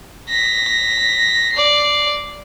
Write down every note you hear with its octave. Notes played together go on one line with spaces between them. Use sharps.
A#6 B6
D5 C7